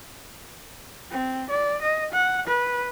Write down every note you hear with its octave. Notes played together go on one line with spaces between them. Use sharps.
C4
D5
D#5
F#5
B4